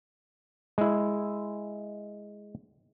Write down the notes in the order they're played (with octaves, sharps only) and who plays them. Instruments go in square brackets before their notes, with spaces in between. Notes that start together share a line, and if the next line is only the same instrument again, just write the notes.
[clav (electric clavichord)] G#3 E4